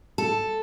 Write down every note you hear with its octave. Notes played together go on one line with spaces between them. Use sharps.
A4